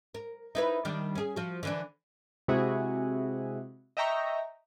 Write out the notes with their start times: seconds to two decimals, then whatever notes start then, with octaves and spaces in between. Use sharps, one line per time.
0.14 A#4
0.55 D#4 E4 B4
0.85 D#3 G3 D4
1.15 C#4 G#4
1.36 F3 F#4
1.63 D3 E3 D4
2.48 C3 G#3 E4 F#4 G#4
3.97 D#5 E5 G5 A#5 C#6